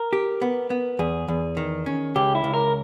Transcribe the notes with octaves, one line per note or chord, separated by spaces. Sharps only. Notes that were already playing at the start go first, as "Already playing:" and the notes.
Already playing: A#4
G4
B3
B3
E2 G#4
E2
D#3
C#4
C#2 G4
E4
C#2
A#4